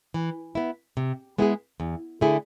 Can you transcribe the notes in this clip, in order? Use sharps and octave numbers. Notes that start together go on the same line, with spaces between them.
E3
B3 E4
C3
G#3 B3 E4 G#4
E2
D3 A3 E4 G#4